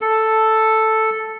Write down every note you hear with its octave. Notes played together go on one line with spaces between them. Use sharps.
A4